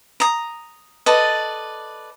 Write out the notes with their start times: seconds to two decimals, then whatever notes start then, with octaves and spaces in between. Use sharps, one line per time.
0.20 A#5 D#6
1.06 A4 B4 D5 D#5